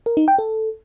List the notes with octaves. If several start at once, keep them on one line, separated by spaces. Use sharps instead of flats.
A#4
D#4
G5
A4